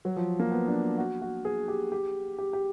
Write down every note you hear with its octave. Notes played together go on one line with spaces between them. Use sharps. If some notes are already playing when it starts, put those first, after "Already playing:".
F#3
F3
A#3
B3
D4
F#4
F#4
G#4
G4
G4
G4
G4